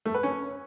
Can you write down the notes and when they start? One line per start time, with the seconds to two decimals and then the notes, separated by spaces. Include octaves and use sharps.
0.06 A3
0.14 B4
0.23 C#4